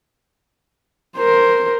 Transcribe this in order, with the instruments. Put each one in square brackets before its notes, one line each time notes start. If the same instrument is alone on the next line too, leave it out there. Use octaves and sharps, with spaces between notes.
[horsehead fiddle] A#4 C5